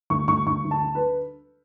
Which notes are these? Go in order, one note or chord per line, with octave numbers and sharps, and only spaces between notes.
D2 C#6
D2 C#6
D2 C#6
D2
A5
D3
B4